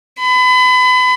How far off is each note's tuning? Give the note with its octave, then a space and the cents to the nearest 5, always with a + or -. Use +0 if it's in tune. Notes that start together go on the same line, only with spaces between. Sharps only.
B5 +30